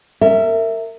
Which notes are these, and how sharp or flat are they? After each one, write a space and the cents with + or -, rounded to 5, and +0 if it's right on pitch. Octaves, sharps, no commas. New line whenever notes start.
A#4 -30 E5 +0